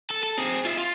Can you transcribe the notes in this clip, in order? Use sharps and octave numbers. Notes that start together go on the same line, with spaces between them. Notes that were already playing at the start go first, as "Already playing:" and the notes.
A4
A4
C4 G#4
F4 E5
F4